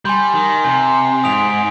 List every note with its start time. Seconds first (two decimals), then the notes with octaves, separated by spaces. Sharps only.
0.05 G3 G#5 C6 G6
0.35 D#3
0.64 C3 G#5 C6 G6
1.24 G#2 D#6 B6 D7 F7